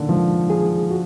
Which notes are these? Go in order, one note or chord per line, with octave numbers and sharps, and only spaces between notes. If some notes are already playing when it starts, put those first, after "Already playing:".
Already playing: A#2 D3 D#3 D#4
F3 G#3
G#4
F#4